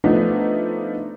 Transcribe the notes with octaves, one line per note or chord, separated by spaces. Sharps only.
F3 A3 B3 D4 D#4